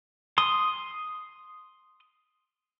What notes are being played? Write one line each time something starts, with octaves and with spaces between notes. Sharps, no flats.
C6 D#6